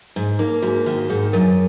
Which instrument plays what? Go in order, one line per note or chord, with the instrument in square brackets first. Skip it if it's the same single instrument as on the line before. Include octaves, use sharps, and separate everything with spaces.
[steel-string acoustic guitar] G#2
[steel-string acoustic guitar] A#3 [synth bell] D#4
[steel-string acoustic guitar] G#2 [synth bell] F#4
[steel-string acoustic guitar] D#3 [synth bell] F#4
[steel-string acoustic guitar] G#2 [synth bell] G#4
[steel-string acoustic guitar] F#2 [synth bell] A#4